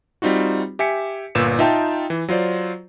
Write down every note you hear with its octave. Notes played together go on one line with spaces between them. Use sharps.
G3 C4 D#4 F4 F#4
G4 E5 G#5 B6 C#7
G1 A#2 B4 E6 G6 E7
D#4 F4 E5 G5 A5
E3
F#3 F4 C5 D5